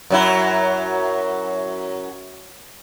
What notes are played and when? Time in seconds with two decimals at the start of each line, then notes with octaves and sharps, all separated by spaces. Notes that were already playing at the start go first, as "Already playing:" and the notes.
0.10 F#2 F#3 E4